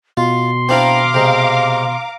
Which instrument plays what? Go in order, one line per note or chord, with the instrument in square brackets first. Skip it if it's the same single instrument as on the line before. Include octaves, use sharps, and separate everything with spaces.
[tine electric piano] B2 [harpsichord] F4 [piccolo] C6
[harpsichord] C4 D4 E4 [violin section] F5 A#5 D6
[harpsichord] C3 G#3